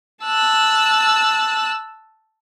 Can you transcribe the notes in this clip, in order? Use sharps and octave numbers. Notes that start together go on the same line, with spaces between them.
A5 E6 F#6